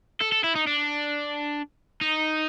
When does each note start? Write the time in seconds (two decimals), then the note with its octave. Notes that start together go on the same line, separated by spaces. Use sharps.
0.21 A4
0.32 A4
0.44 E4
0.55 D#4
0.67 D4
2.01 D#4